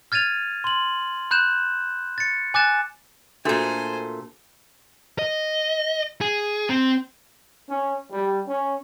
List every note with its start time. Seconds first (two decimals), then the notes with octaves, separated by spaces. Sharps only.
0.12 F6 G#6 A6 D#7 F7
0.64 C6 F#7
1.31 B5 F#6 G6 E7
2.18 A6 C#7
2.54 G#5 D6 F#6 A6 E7
3.45 A#2 A3 D4 F#4 A4 C5 G#5
5.19 D#5
6.21 G#4
6.69 C4
7.69 C#4
8.12 G3
8.47 C#4